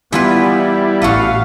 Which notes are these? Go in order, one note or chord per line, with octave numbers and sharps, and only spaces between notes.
E3 G3 B3 E4 F4 B4
A1 F#4 A4 B4 F5